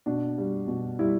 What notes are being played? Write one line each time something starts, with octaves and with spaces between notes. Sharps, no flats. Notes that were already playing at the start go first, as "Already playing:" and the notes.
B2 D4
G3
B2
G3 E4